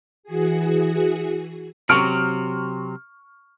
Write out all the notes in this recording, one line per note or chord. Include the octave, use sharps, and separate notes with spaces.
E3 F#4 G#4
C3 F#3 C#6 F6 D7